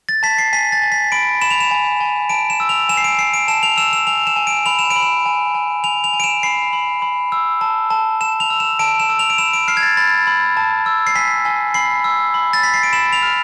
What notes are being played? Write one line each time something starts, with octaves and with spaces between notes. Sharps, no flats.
A6
A5 B6
C7
G#5 B6
A6
G#5
B6
B5 D7
B5 E7
F7
E7
G#5
G#5
A5 D7
E7
E6
F7
G#5 E7
C7
D7
G#5 C7
D7
A5 E7
F7
E6 E7
E7
G#5 F7
E7
G#5
D7
B5 F7
E7
D7
B5
E7
G#5
G#5
G#5 F7
F7
G#5
D7
E7
B5 C7
B5
B5
E6
A5
A5
A5 E7
F7
E6
E7
A5 D7
E7
E6
F7
D7
B5 E7
D7
F6 C7
G#6
A6
B5 A6
B5
A5
E6
C7
G#5 B6
G#5
B5 C7
E6
B5
A6
B5 B6
C7
D7
B5 E7
F7
F6